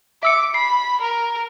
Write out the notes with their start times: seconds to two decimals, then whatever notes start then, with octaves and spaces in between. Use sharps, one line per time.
0.23 E5 D6 E6 C#7
0.54 B5 C7
1.01 A#4